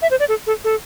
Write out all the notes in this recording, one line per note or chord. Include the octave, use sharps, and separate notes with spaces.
E5
C5
D5
A4
A4
A4